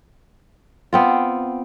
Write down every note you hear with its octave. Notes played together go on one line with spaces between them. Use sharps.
B3 C4 F4